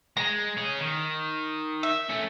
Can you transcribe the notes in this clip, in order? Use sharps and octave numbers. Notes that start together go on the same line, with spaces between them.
G#3 A#5
C#4 G#4
D#3
E5
A3 C#4